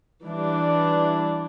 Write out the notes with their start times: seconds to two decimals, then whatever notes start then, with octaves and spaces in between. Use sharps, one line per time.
0.23 E3 G3 D4